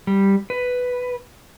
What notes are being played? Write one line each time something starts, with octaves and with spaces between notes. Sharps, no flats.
G3
B4